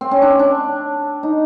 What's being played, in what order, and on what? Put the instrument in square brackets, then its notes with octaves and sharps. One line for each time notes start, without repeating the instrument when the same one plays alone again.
[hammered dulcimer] C4
C#4
D4
D4
D#4